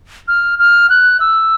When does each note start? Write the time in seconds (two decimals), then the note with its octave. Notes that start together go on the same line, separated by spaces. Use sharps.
0.28 F6
0.59 F6
0.90 F#6
1.20 E6